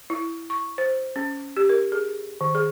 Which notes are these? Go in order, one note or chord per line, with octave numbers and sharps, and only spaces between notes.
E4
C#6
C5
C#4
G4
A#4
G#4
D#3
G#4